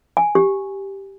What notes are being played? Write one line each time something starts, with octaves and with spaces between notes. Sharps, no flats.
G#5
G4